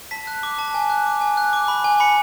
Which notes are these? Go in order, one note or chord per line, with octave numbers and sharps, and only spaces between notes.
A5 B6
F#6
D6
A5
G#5
F#6
D6
G#5
F#6
D6
B5
G#5
B5 C#7